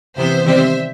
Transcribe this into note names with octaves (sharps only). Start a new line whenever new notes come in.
C3 E3 B3 C5 E5
C3 D#3 G3 C4 C5 E5